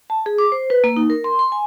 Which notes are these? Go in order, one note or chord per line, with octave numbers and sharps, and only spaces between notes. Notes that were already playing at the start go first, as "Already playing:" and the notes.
A5
G#4
D6
C5
B4
A#3
D#4
A#4
C6
C6
G#5